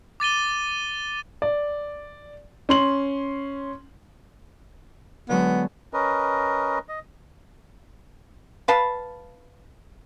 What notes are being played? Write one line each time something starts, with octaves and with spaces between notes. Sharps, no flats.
D6 A6 D#7 G7
D5
C#4 C6 F#7
D3 F#3 G#3 B3
C#4 A#4 B4 D#5
D#5
B4 F5 A5